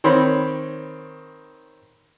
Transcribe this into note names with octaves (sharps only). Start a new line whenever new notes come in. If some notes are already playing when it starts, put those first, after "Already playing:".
D#3 C4 C#5 B5